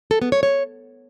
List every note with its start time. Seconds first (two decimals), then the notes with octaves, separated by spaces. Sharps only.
0.11 A4
0.22 B3
0.32 C#5
0.43 C#5